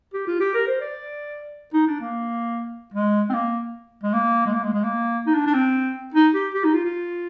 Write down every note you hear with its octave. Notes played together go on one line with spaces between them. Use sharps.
G4
F4
G4
A#4
C5
D5
D#4
D4
A#3
G#3
C4
A#3
G#3
A#3
G#3
A#3
G#3
G#3
A#3
D#4
D4
D4
C4
D#4
G4
G4
D#4
F4
F4